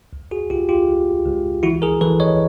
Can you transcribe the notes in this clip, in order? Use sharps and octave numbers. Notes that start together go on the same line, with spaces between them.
C#2
F#4 G#4
C#2 F4 G4
F4 G4
C#2
C#2
E3 E4 F#4
G#4 A#4
E3 A4 B4
C#5 D#5